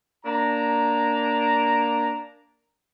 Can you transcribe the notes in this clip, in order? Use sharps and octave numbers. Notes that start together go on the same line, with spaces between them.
A#3 D4 A#5